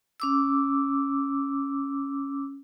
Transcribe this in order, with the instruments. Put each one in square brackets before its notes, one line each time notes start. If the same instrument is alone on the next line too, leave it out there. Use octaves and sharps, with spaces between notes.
[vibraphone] C#4 D6 E6